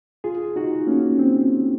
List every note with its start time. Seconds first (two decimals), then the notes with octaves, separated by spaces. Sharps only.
0.24 F4 G#4
0.56 D#4 F#4
0.87 A#3 C#4
1.19 C4